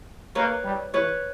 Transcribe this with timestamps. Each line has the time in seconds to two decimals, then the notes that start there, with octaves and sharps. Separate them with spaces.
0.35 A#3 B4 C#5
0.64 G3
0.93 E3 B4 C#5